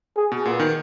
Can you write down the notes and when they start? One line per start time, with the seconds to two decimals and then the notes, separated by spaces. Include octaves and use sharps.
0.17 G#4
0.32 B2
0.45 A#2 B3
0.59 D#3